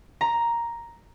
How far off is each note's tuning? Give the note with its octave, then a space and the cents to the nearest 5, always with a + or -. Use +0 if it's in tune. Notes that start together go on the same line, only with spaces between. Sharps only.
A#5 +5